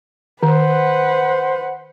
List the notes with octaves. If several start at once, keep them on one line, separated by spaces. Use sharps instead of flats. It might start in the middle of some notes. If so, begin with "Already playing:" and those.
D#3 B4 C5 F#5